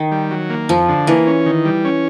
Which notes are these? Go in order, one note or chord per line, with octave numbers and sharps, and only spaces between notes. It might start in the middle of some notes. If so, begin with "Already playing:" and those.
Already playing: D#3
G3
F#3
A#3
F2 F3
D3
E3 A#3
C#4
D#3
G3
C#4